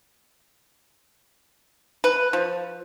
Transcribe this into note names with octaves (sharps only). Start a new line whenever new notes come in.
B4
F3